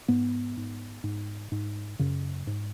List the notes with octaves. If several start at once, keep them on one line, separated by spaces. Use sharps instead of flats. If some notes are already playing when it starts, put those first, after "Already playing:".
G#2 B3
G#2
G#2
G#2
F#2 C#3
G#2